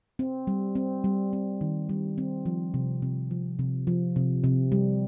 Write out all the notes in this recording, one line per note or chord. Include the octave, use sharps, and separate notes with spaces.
C4
G3
C4
G3
C4
D#3
G3
C4
F3
C3
C3
F3
C3
F3
C3
C3
G3